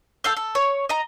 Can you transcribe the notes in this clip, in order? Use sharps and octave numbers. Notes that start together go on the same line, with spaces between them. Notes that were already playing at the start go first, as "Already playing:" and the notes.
A4 F5 G6
A4
C#5
D#5 A#5